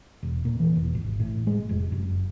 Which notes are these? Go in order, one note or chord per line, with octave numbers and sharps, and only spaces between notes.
E1
A#2
E3
E1
G#1
A2
G#3
F1
F#1